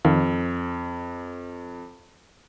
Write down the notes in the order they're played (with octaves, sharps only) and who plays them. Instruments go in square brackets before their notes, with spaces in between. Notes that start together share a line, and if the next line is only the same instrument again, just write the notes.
[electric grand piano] F2 [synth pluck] D#3 F5